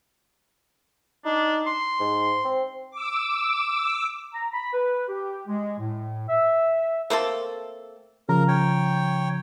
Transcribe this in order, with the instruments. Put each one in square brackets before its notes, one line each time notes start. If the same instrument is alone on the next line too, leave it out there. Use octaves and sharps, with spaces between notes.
[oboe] D4 [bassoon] D#4
[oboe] C6
[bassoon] G#2
C4
[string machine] D6 E6
[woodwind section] A#5
B5
B4
G4
G#3
A2
E5
[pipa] A3 A#3 C4 A4
[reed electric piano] C#3 F3 A#5 [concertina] A#4
[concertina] C#5 G5